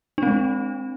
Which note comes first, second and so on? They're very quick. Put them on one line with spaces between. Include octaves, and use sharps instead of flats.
D4 C4 G#3